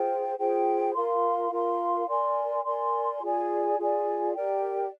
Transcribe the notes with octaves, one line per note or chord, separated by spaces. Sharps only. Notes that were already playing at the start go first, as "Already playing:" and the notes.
Already playing: F4 G#4 C5 G5
F4 G#4 C5 G5
F4 A#4 F5 C6
F4 A#4 F5 C6
A#4 D5 G#5 C6
A#4 D5 G#5 C6
F4 G#4 D5 G#5
F4 G#4 D5 G#5
G4 A#4 D5 G5